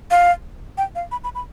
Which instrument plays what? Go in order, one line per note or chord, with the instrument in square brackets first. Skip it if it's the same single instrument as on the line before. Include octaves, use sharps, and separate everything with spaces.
[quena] F5
G5
F5
B5
B5
B5